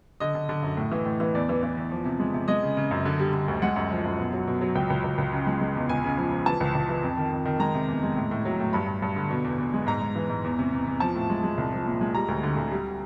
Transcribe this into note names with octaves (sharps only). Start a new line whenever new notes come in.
D3 D#5
D3
D3
F#2
A2
E3
A2
E3
E2 D5
E3
E3
E2
F3
C3
G#3
C3
G#3 D#5
C#3
C#3
F#2
D3
G3
D3
D2
G#3 F#5
F#2
F3
F#2
B2
F#3
B2
F#3
C#2 G5
C#2
C#2
C#2
C#3
G#3
G#3
E2
C#2 G#5
C#3
F3
F3
E3 A5
C#2
C#2
E3
F2
D#3
F2
D#3
G#3 A#5
C3
E2
G#3
A2
A2
F#3
A2
G2 B5
G2
G2
D3
B2
E2
E2
G#3
G#2 A#5
G#2
E3
G#2
E2
C3
E2
E2
F3 A5
A2
G#3
G#3
C2
F3
A#2
G#3
G3 A#5
D2
D3
D2
G3